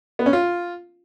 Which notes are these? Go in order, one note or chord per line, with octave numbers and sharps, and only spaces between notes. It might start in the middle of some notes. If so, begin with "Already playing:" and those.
B3
C#4
F4